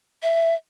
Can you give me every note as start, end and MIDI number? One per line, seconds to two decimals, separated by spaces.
0.23 0.55 76